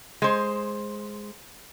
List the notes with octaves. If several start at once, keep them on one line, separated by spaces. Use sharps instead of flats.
G#3 C5